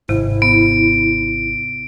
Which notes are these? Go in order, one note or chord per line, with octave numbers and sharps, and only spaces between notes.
G#1 C3 E4
B3 D7